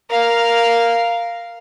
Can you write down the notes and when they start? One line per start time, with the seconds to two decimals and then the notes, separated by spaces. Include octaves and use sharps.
0.10 A#4 F5